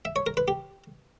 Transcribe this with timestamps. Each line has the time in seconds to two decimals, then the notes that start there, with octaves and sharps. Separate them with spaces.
0.05 E5
0.16 C#5
0.27 A#4
0.37 B4
0.48 G4